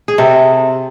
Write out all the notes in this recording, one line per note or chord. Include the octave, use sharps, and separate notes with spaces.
G#4
C3 A4